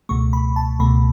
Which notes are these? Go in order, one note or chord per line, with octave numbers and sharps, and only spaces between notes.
C#2 B2 A3 C#6
B5
A5
C#2 B2 A3 B5